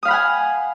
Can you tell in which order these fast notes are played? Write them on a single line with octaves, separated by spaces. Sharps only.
D#6 F5 B5 F#5 G#5